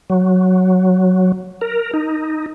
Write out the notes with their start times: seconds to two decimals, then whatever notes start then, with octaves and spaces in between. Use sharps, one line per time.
0.10 F#3
1.61 A#4
1.94 D#4